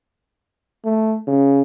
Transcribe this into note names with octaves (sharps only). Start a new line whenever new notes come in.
A3
C#3